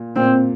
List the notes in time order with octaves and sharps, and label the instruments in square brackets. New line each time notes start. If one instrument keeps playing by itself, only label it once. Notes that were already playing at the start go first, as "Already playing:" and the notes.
Already playing: [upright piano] A#2
[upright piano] A#2 [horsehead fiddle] C4